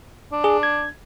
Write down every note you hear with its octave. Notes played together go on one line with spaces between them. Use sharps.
D4
G#4
G#6